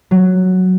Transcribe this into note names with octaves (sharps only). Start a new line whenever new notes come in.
F#3